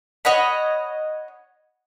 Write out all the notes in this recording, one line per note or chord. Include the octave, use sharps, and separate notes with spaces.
C#5 D#5 F#5 B5